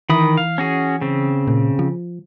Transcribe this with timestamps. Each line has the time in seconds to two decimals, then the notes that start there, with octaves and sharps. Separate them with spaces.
0.10 D#3 E3 B5 D#6
0.37 F5
0.58 C#4 F#4 G#4
1.01 C#3 C4
1.48 A#2
1.79 F3